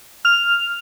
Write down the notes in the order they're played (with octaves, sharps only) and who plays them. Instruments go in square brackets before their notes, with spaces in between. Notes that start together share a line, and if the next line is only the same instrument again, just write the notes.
[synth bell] F6 F7